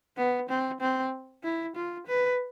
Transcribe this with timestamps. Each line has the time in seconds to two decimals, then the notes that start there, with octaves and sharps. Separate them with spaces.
0.17 B3
0.49 C4
0.81 C4
1.44 E4
1.75 F4
2.07 B4